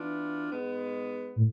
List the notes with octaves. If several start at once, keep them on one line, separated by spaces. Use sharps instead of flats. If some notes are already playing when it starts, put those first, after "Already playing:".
Already playing: E3 B3 D4 F4
G#2 G#3 B3
A2